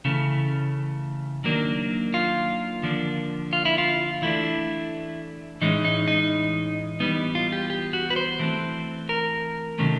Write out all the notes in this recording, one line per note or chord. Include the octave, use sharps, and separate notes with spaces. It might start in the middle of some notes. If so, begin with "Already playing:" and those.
C#3 E3 A3
D#3 F#3 A#3 D4
F4
D3 F3 A#3 D4
F4
E4
F4
E3 A3 D4 E4
A2 E3 G#3 C#4 D#4
D#4
D#4
E3 G3 B3 D#4
F4
G4
G4
F#4
B4
C5
E3 A3 C4
A#4
C3 D#3 F#3 A3 C#4